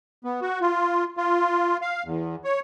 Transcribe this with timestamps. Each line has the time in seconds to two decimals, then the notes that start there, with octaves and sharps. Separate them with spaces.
0.24 B3
0.42 F#4
0.61 F4
1.17 F4
1.81 F5
2.05 E2
2.44 C#5